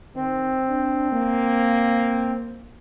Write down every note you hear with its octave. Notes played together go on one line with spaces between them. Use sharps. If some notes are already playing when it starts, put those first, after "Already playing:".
D#3 C4
D4
A#3